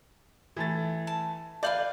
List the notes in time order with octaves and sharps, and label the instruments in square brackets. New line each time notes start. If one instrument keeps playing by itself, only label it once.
[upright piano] E3 A3 A6
[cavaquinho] A5
[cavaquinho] B4 F5 D6 [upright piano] D5 G6 F#7